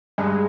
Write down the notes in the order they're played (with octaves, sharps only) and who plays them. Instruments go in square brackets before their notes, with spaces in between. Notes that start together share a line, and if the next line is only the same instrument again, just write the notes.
[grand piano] G2 [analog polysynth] G#3